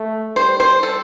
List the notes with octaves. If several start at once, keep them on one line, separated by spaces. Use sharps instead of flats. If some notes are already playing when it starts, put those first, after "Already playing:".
Already playing: A3
G3 C5
C5
A4